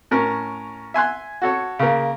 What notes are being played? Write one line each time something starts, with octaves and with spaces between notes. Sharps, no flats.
A2 C#4 A#4
E5 G#5 C6 F#6
F#4 A4 C#5
C#3 A#3